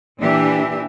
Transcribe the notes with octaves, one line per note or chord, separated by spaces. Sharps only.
A#2 E3 D4 G4 E5